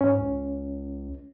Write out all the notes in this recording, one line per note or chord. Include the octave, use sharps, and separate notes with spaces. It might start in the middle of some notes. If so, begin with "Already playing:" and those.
G#2 C#4
C#2